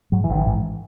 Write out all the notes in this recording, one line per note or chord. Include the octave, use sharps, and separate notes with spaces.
G#2 F#3
E3
A1
D#3
G#2 E3